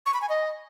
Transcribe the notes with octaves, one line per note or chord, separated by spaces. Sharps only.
C#6
B5
G#5
D#5